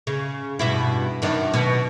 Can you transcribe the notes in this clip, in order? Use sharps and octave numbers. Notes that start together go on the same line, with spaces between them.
C#3
G2 B2 E4
F#2 D#3 D4
B2